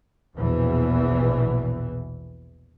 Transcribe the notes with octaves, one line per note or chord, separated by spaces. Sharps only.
A#1 E2 B2 E3